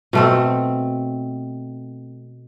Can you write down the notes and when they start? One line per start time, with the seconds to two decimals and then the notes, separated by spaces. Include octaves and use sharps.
0.13 B2 A3 C4